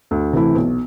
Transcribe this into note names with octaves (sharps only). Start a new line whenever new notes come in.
D2
C3 E3 A3 E4
B1